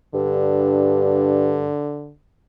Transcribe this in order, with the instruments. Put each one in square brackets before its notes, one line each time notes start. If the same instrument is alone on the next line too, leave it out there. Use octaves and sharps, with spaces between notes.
[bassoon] G2 [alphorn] D3